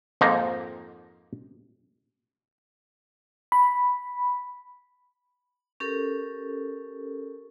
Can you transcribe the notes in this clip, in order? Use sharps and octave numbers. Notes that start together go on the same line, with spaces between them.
F2 G#2 F3 A#3 D#4
B5
C#4 G4 A4 A#4